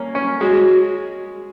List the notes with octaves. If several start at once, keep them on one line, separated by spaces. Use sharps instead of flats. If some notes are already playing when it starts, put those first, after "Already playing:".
Already playing: A#3 C#4
C#4
G#3 F#4